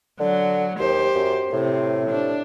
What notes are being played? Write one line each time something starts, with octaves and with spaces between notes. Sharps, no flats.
D3 F#3
D#2 G4 C5
F#2
A2 C3
D4